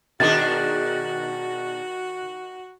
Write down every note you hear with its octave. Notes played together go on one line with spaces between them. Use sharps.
B2 D#3 D4 F#4 G#4 A6